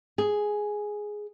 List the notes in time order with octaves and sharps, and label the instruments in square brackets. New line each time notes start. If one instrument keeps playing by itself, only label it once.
[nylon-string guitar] G#4